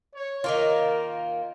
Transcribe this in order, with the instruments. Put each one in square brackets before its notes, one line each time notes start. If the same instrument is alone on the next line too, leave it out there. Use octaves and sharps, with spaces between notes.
[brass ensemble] C#5
[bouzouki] D#3 A#3 F4 [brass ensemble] A#4